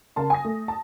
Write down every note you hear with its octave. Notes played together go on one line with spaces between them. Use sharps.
C#3 A#4 A5 C6
G#5 D#6 A#6
A3
A5